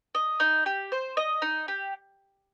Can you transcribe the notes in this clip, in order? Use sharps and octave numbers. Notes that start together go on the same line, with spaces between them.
D#5
D#4
G4
C5
D#5
D#4
G4